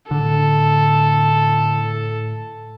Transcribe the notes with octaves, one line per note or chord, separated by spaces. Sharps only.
A2 D3 A4